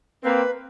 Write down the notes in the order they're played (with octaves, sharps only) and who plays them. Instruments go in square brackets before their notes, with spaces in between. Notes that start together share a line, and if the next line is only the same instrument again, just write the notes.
[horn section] A#3 C4 [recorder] B4